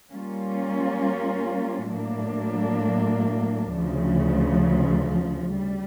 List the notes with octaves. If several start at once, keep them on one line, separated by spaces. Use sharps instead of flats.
G3 A#3 C#4 F4
A2 F#3 A#3 D4
D2 C#3 F3
G3